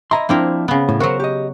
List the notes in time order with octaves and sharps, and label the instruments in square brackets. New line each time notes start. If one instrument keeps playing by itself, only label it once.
[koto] E4 [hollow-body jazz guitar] D#5 A#5 C6
[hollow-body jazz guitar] F3 D4 E4 [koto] A#3 C4 A#4
[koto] C#3 B3
[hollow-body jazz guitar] A2
[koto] F#3 F#4 [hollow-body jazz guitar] A#4 C5
[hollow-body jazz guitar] G4 D#5